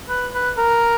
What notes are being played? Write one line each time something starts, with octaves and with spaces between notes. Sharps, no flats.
B4
B4
A#4